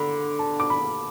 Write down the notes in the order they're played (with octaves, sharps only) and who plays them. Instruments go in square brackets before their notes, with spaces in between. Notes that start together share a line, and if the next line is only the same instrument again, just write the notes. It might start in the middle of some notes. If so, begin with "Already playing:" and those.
Already playing: [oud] D3 [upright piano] B5
[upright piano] A5
D6
B5